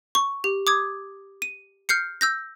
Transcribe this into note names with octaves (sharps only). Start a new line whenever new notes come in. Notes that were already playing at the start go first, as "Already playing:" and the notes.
C#6
G4
D6 D#6 G#6
D#7
F6 G6 C7 C#7
E6 G6 A#6